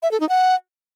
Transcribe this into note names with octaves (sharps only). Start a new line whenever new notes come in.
E5
A4
D#4
F#5